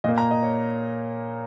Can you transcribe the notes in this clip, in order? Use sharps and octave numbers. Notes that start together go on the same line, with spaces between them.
A#2 A#3 D#5
A#5
D#5
C#5